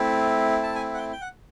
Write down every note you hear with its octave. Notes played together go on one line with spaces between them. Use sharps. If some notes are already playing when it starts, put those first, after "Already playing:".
Already playing: A3 C4 E4
A5
G#5
F#5
G5
G5
F#5